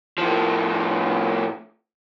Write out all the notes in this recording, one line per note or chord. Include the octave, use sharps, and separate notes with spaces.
A2 F3